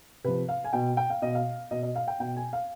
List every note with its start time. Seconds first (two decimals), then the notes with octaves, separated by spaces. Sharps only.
0.24 C3 F3 B4
0.49 F5
0.64 G#5
0.73 B2 G5
0.97 G5
1.10 F5
1.22 B2 D#5
1.35 F5
1.71 B2 D#5
1.83 D#5
1.95 F5
2.08 G5
2.20 B2 G5
2.37 G#5
2.53 F5